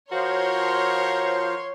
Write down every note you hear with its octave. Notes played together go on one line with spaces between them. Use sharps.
F3 F#4 A#4 C5 C#5 F5 C6